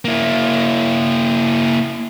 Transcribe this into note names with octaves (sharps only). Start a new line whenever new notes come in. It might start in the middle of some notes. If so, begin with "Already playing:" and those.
A#3 E4